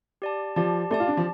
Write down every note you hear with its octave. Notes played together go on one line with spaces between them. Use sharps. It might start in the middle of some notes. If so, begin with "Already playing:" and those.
G4 D5 A5
F3 G4 D5 A5
A3 G4 D5 A5
F4
D4
F3